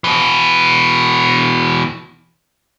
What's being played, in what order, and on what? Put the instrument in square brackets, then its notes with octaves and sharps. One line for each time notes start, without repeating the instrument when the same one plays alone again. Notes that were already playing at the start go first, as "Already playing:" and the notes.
[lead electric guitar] B2 E3